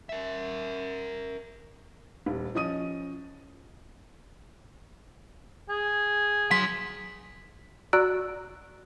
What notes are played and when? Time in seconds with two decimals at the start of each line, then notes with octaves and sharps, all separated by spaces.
0.09 A#4 E5
2.26 D#1
2.55 F3 C#4 D#5 D#6 D#7
5.69 G#4
6.51 F#3 C6 B6
7.93 F#4 D5 A#5 E6 F#6 D7